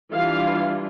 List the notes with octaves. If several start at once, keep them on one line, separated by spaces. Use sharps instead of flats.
E3 G3 D4 F4 F5